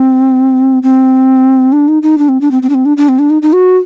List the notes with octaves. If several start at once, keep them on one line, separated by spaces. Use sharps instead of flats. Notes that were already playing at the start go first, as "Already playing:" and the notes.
Already playing: C4
C4
D4
D#4
D#4
D4
C4
D4
C4
C4
D4
C4
D4
D4
C4
D4
D#4
D#4
F#4